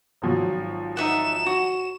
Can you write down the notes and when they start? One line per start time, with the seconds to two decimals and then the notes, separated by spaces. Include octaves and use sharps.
0.22 G#1 F3 F#3
0.97 D#4 E5 F#5 E7
1.46 F#4